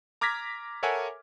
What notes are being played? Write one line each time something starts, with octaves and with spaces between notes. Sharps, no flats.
A#5 D6 F6 G#6 A#6 B6
A4 A#4 C#5 E5 F#5 G#5